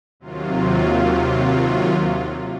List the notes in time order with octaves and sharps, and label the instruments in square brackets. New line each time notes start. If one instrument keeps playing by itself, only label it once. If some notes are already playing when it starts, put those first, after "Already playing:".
[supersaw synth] D#2 C3 F#3 F4